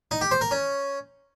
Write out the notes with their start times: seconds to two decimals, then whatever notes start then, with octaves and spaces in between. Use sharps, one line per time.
0.11 D#4
0.21 G4
0.31 C5
0.41 A#4
0.51 C#4